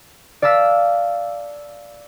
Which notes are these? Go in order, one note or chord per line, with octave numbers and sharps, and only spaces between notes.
D5 F5 A5 E6 B6